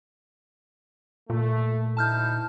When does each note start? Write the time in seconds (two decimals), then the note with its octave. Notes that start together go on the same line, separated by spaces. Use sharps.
1.30 A#2 A3
1.97 D2 D#4 E4 A5 F6 G6